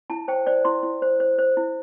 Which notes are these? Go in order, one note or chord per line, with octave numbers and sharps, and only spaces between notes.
E4 A5
C5 G5
C5 D5
E4 C6
E4
C5
C5
C5
E4